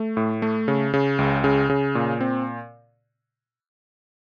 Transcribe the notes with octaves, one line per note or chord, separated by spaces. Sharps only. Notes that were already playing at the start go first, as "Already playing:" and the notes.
Already playing: A3
A2
A3
C#3
C#3
C#2
C#3
C#3
A#2
C4